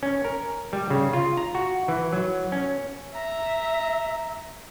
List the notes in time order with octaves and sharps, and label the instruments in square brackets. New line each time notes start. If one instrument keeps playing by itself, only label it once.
[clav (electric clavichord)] C#4
A#4
G3
C#3
F4
A#5
F#4
E3
F#3
C#4
[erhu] E5 [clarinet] A#5